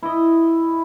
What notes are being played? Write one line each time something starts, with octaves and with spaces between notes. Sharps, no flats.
E4 D#5